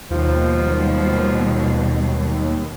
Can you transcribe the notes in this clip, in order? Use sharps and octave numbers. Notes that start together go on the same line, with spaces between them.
D#2 B2 F3 G3